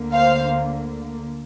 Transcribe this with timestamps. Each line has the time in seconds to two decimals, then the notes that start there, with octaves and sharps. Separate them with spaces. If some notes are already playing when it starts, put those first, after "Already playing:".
Already playing: D2 D3 A#3
0.11 C5 F5